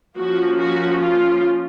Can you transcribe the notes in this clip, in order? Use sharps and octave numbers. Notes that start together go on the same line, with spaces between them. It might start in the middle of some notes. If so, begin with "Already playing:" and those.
F3 A#3 C#4 F#4
F#4
F4